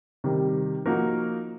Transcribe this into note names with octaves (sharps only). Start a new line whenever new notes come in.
C3 D#3 G3
F3 A#3 D#4 F#4 A#4